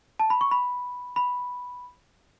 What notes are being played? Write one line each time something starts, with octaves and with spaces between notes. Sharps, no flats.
A5
B5
C#6
B5
B5